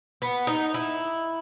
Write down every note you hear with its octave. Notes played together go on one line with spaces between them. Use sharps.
B3
D#4
E4